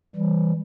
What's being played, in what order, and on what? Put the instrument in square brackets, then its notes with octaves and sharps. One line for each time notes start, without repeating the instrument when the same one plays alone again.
[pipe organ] E3 G3